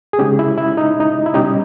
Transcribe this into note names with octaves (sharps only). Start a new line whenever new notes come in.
G#4
C#3 G#3 C#4 D#4 G4
E4
E4
D#4
D#4
E4
B2 G3 C#4 D#4 G4